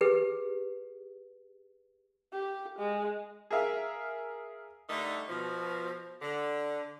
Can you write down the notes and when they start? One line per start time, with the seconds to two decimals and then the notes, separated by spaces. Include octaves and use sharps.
0.01 G4 G#4 B4
2.33 G4
2.78 G#3
3.51 G#4 A#4 E5 F5
4.88 D3 G3 A3 D#4
5.28 B2 F3
6.21 D3